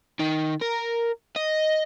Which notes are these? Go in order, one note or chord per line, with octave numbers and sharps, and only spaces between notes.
D#3
A#4
D#5